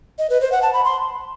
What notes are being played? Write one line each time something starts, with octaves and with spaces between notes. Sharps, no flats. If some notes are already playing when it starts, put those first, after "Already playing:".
D#5
B4
C5
F#5
A5
B5
C6